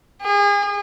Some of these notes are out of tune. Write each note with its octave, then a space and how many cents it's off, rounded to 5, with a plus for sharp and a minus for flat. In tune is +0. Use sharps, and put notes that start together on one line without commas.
G#4 -35